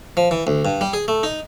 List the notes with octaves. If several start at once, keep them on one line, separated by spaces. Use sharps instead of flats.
F3
E3
D2
G2
G3
G#4
A3
D#4